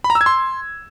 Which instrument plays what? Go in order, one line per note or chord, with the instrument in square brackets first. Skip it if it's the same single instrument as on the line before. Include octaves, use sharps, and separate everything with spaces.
[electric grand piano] B5
A#5
E6
G#6
C6